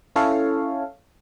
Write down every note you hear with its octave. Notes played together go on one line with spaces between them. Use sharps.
C#4 E4 A4 C#5 F5